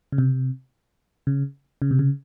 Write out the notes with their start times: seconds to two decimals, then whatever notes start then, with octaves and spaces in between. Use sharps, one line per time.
0.12 C#3
0.18 C3
1.27 C#3
1.82 C#3
1.91 C3
1.99 C#3